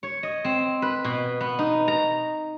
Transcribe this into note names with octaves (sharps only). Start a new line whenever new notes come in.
C#5
D#5
C4
B4
B2
B3
D#4
A#5